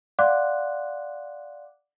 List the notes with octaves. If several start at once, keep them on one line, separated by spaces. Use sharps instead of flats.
D5 F5 F#5 C6 D6 F#6